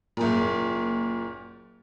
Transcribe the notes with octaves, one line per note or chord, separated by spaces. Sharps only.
F#1 A#2